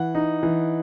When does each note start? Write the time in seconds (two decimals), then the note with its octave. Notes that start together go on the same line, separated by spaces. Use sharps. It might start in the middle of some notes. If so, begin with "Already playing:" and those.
Already playing: E3 F#5
0.15 D#4
0.43 E3